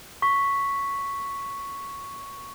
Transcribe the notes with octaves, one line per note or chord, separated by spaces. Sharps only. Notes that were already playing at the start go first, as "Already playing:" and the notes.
C#6 B6